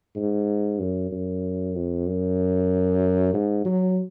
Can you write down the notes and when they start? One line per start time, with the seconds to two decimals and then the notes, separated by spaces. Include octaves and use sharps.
0.16 G#2
0.79 F#2
1.11 F#2
1.75 F2
2.07 F#2
3.34 G#2
3.65 F#3